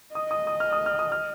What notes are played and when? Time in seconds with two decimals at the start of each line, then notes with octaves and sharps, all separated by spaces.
0.15 D#5 D#6
0.31 D#6
0.47 D#6
0.60 F6
0.73 D#6
0.86 F6
0.99 D#6
1.12 F6